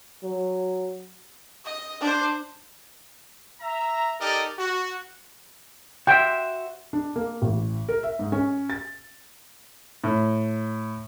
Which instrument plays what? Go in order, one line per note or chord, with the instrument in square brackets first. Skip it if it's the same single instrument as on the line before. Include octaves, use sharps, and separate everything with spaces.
[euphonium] F#3
[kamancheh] D#5
D4 C5
[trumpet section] E5 A#5
D#4 G4 A4 A#4 D5 D#5
F#4
[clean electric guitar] F#4 C5 E5 [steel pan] G5
[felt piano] D4
A#3
A1
A#4
E5
G#2
C#4
A6
[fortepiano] A2